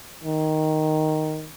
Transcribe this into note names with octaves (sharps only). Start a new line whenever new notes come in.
D#3